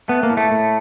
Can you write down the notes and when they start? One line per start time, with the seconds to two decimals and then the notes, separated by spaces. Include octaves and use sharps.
0.08 A3 B3
0.23 A#3
0.30 A2
0.37 A3
0.51 A2